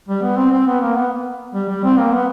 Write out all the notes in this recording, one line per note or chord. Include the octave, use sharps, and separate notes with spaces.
G3
B3
C4
C4
B3
A#3
B3
G3
G3
C4
A#3
B3